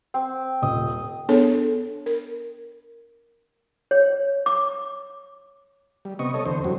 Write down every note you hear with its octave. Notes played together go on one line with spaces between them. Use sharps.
C4
D#1 D#5
B3 D4 G#4 A4 C#5
A#4
C#5
D6
G3
C3 B3 D#5 C#6
A4 C#5 D#5
E2 D3 C5
F#2 F#3 G3